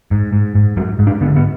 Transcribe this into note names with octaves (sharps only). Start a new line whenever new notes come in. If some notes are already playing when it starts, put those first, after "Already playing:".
G#2
G#2
G#2
G#2 F#3
G#2
D4
D3 B3
B3